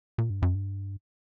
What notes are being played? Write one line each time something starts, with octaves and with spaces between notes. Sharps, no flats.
A#2
G2
F#2
G2